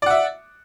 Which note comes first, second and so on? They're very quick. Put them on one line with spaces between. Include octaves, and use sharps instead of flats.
D5 F#5 E5